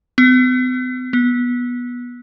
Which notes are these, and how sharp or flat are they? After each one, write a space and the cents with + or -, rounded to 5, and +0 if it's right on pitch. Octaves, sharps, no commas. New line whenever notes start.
B3 +45
B3 -15